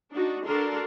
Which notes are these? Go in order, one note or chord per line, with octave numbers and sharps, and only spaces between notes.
D4 D#4 F#4
D3 D4 F#4 A4 A#4 C6